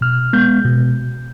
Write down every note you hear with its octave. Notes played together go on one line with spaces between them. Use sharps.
B2 F6
G#3 B3 G6
B2